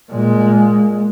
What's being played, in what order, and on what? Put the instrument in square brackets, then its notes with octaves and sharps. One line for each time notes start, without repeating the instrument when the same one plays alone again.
[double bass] A#2 G#3